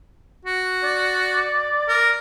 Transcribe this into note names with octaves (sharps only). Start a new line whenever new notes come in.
F#4
D5
A#4